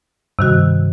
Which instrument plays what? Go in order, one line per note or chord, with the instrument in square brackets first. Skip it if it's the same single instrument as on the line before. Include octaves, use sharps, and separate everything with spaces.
[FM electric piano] G2 [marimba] C3 D#3 F#4